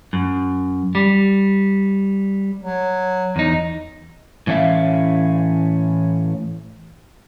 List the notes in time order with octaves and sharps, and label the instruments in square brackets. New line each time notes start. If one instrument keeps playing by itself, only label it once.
[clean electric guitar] F#2
G3
[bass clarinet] F#3
[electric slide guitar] E2 D#4
A2 E3 C#4 C#5 E5 F5